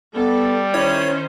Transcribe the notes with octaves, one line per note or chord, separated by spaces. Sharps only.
G3 B3 A4
D#3 C#4 E4 C5 C#5